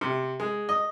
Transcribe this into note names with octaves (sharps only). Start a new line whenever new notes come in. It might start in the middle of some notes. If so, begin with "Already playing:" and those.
C3
G#3
D#5